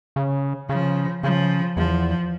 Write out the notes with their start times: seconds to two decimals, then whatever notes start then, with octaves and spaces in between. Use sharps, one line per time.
0.16 C#3
0.69 C#3 F3
1.23 C#3 F3
1.77 E2 F3